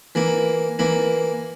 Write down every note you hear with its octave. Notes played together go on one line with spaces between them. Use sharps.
E3 A#3 E4
E3 A#3 E4